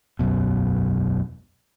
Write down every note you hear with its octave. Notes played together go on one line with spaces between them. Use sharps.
E1 B1 F#2 B2